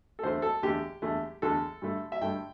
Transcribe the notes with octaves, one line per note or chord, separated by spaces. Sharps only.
A4
E2 D3 A3 C5
A4
E2 D3 A3 G4
E2 D3 A3
E2 D3 A3 A4
G2 D3 A3
E5
G2 D3 A3 G5